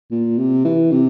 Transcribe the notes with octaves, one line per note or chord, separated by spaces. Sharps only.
A#2
C3
E3
C3